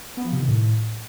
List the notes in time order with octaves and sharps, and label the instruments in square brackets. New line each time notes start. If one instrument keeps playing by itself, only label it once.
[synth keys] B3
F3
C3
D#3
A2